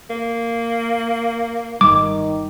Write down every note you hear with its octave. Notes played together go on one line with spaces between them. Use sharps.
A#3
G1 D#3 G3 D6